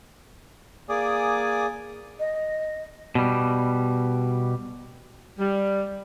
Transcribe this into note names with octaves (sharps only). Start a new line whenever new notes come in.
A#3 G#4 D5 G#5 D6 D#6
D#5
B2 G3
G3